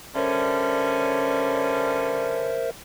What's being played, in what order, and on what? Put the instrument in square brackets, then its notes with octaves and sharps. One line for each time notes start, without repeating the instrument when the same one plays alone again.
[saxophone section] D3 G3 C#4 [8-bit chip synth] A#4 C5 E5